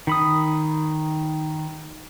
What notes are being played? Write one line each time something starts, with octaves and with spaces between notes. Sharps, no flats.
D#3 B5 D#6